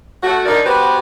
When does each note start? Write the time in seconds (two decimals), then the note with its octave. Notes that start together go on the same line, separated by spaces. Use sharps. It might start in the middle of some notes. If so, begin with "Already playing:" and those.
0.23 A3 F#4
0.45 D3 D#4 A#4 D5
0.64 B3 F#4 G4 B4 C5